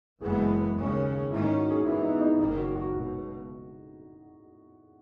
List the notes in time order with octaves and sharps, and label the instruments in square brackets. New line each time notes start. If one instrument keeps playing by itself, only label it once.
[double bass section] F#1 F#2 E3 G#3 B3 [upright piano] G#4
[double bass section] D#2 C#3 G#3 C#4
[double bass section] G#2 D#3 A#3 C#4 [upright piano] E4
[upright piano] D#4
F#4
G#4
[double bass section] G#2 E3 B3 [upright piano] E4
[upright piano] D#4
D#4
[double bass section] F#1 F#2 D#3 A#3 [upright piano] D#4
[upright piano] F#4
F#4
[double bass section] C#2 B2 [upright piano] F#4